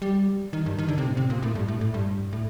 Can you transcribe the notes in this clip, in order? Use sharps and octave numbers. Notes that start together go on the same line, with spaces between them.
G3
D#3
G2
D#3
D3
C3
A2
C3
A#2
A2
G2
A2
A2
G2
A2